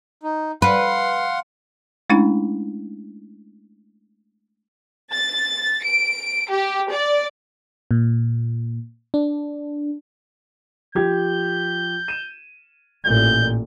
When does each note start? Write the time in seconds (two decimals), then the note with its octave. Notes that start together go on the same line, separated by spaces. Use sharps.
0.23 D#4
0.62 B4 F5 F#5 C6
2.10 G#3 A3 C#4 D4 E4
5.12 A6
5.83 D7
6.50 G4
6.91 D5
7.91 A#2
9.14 D4
10.95 F3 G4 G6 G#6
12.08 D#7 E7
13.05 A1 A#2 G6